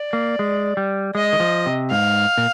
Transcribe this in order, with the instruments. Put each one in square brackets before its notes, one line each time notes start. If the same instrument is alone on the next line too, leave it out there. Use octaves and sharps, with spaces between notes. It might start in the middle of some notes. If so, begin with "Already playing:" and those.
Already playing: [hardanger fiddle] D5
[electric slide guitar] A#3
G#3
G3
[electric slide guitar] G#3 [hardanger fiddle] D#5
[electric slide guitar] D#3
F3
C3
[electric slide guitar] G#2 [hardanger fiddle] F5
[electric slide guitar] A#2